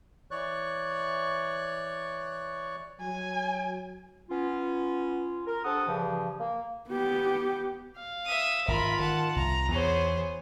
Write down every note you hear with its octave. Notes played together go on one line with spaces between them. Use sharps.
E3 C#5 D5 C#6 F#6
F#3 G#5
B3 C#4 F4
A#4
C3 D4 A4 F#5 D#6
G2 C#3 E3 F3
A#3
B3 G4
F5
E5 D#6
G#1 F4 A#4 B5
D#3 F#5 A5
C2 A#5
E2 B3 G#4 C5 C#5